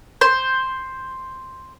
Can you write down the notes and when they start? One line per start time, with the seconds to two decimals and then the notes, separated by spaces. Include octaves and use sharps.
0.21 C5